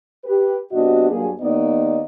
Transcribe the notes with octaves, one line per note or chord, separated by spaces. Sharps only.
G4 B4
G2 C3 B3 D4 F#4 D#5
G2 F#3 A#3 G#4
D#2 A#3 B3 D#4 D5 D#5